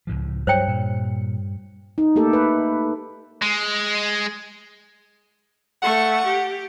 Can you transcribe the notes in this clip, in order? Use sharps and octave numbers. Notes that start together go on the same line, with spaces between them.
C#2 A2 F3
G2 F#3 C5 C#5 G5
A#2
D#4
A3 A#3 G4 A4
B4
G#3
A3 F#5 C#6
G4